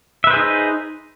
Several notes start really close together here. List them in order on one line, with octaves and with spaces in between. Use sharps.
E5 B4 C5 G#4 D#4